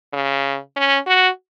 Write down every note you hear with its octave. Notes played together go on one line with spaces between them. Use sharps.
C#3
C#4
F#4